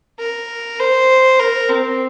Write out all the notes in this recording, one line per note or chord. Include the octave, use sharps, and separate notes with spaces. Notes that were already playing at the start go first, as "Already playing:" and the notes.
A#4
C5
A#4
C4